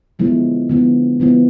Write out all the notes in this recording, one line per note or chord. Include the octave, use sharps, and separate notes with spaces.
D3 F3 G#3 B3 E4
D3 F3 G#3 B3 E4
D3 F3 G#3 B3 E4